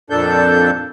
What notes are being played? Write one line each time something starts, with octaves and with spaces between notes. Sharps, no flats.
F2 A#2 D4 A4 G6